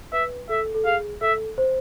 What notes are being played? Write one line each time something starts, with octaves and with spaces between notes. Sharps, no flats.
B4 E5
A4 E5
A4
G#4 F5
A4 E5
C5